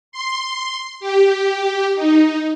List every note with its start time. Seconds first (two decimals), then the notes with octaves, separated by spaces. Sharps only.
0.12 C6
1.00 G4
1.95 D#4